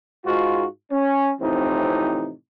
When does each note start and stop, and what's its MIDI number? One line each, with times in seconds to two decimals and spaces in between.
0.25 0.65 44
0.25 0.65 65
0.25 0.65 66
0.91 1.32 61
1.41 2.31 45
1.41 2.31 48
1.41 2.31 52
1.41 2.31 53
1.41 2.31 60
1.41 2.31 63